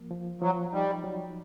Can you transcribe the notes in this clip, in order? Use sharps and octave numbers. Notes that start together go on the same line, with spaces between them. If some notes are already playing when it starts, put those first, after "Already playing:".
Already playing: F3 A#3
F3
F3 F#3
G3 D#4
F#3